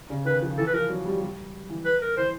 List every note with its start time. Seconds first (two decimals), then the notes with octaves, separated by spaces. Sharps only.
0.10 C#3
0.25 D#3 B4
0.42 F3
0.57 E3 A4
0.67 B4
0.73 F3 A#4
0.89 F#3
1.05 G3
1.21 G3
1.70 E3
1.85 B4
2.02 A#4
2.17 E3 C5